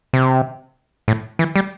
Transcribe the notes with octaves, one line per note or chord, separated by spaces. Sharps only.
C3
A2
E3
G3